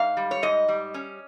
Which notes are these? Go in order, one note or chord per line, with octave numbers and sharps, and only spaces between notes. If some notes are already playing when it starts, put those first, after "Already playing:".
Already playing: G#2 F5
G3
C#5
G#2 D#5
G3
C#4